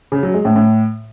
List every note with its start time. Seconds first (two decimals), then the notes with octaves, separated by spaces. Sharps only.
0.12 C#3
0.23 F#3
0.34 G#3
0.45 A2
0.56 A2